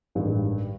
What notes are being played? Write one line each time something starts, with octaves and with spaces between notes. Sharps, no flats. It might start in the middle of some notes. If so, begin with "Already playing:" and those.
A1 G2 D#3 G#3